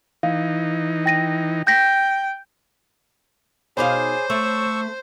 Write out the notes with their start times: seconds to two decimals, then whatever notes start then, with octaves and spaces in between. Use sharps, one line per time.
0.23 E3 D#4 F5
1.06 G5 A#6 D#7
1.67 G5 G6 A#6 B6
3.77 B2 D#4 G#4 C5 C#5 F5 B5 D6
4.30 A3 C#6 E6